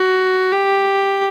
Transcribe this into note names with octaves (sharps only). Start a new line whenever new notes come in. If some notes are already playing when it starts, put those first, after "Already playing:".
Already playing: F#4
G4